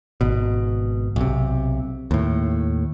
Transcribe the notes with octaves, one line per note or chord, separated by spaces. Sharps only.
G#1 B2
B1 C3
D#2 A2